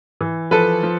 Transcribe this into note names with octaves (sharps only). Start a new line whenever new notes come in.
E3
F3 A4 B4
F3